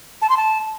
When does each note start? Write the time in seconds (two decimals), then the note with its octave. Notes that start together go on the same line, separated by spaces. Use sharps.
0.22 A5
0.29 C6
0.37 A5